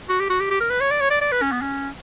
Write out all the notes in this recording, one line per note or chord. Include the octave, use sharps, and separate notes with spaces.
F#4
G4
F#4
G4
G4
A#4
B4
C#5
D5
C#5
D5
D5
B4
C#4
B3
C#4